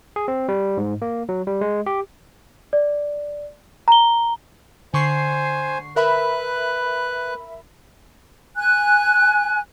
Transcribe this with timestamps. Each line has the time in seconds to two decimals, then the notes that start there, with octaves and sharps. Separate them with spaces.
0.16 G#4
0.28 C4
0.49 G3
0.77 G#2
1.02 A#3
1.29 F#3
1.47 G3
1.61 G#3
1.86 G4
2.73 D5
3.88 A#5 G7
4.94 D3 C5 G#5 C#6 C7
5.96 A#4 B4 E5 B5 F#6
8.57 G#5 F#6